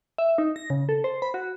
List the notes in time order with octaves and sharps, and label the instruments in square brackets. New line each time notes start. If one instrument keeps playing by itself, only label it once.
[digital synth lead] E5
D#4
A#6
C#3
A4
C5
B5
F#4